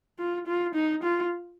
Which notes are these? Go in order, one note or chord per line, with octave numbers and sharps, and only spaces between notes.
F4
F4
D#4
F4